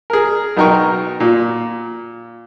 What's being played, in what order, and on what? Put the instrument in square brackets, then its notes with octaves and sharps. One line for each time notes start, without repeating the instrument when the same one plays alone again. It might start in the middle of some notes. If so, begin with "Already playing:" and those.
[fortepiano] G#4 A#4
B1 D#4 A#4 G5 C#6
A#2